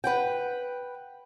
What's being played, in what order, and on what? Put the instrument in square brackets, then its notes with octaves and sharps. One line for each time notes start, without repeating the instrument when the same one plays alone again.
[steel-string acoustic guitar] B4 F#5 G5